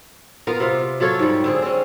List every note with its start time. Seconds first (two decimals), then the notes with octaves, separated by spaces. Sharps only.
0.47 B3 F4 A#4 F5
0.60 C3 F4
1.00 F#3 F4 A4 C#5
1.19 G#2 G3
1.44 D3 C4 G#4
1.62 C4 C#4